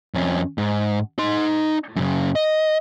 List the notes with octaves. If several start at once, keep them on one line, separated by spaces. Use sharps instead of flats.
F2 C#4
G#2
D#4 C6
F#2 C#3
D#5